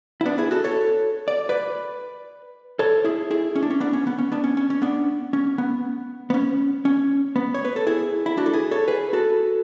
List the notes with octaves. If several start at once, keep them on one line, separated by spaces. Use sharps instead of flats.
E4
B3 D4
E4 G#4
F#4 A4
A4 C#5
D5
B4 D5
A4 C#5
E4 G#4
E4 G#4
C#4
D4
C#4
B3 D4
C#4
B3
C#4
B3 D4
C#4
C#4
C#4
B3 D4
C#4
B3
B3
C#4
C#4
B3
C#5
B4
A4
E4 G#4
E4
D4 F#4
A4
E4 G#4
A4 C#5
G#4 B4
F#4 A4